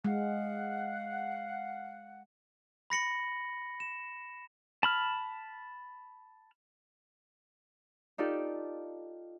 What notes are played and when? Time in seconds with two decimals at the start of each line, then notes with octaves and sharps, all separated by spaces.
0.05 G#3 F5 F#5
2.90 B5 A#6 C#7 F#7
3.80 E7
4.83 A5 B5 F6
8.18 D#4 F4 G4 A4 D5